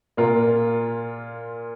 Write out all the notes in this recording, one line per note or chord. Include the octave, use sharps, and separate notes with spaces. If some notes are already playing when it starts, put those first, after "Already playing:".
A#2 A#3 F4 A#4